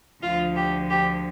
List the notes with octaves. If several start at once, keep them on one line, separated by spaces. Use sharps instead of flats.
D2 D3 F3 F4
G4
G4